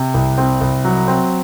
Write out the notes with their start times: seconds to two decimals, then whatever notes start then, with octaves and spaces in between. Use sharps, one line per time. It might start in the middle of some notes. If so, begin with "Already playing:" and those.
Already playing: C3
0.14 C2
0.38 C4
0.61 C2
0.85 F#3
1.08 C4